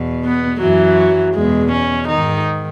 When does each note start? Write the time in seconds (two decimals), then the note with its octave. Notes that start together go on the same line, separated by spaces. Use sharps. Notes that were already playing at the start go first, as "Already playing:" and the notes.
Already playing: E2 B2
0.24 B3
0.60 F#2 E3 F#3
1.35 E2 B2 G#3
1.72 C#4
2.08 G#2 D#3 D#4